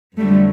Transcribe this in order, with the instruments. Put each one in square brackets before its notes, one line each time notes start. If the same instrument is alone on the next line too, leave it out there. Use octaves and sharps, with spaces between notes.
[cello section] F2 D3 F#3 G3 A3